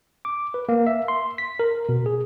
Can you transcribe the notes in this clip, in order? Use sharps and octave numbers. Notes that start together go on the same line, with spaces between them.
D6
B4
A#3
E5
C6
B6
A#4
B2
G#4